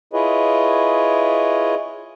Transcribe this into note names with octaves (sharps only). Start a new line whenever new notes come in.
E4 F4 G#4 B4 C#5 D#5